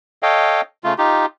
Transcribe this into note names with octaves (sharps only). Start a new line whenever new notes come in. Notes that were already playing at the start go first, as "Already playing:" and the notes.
A4 C#5 D#5 F5 G5
C#3 A3 F4
D#4 F4 G4